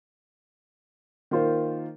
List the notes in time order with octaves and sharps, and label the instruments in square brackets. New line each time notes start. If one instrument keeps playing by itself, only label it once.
[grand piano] D#3 A#3 F4 C5